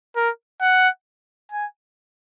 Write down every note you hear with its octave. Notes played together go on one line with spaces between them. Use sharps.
A#4
F#5
G#5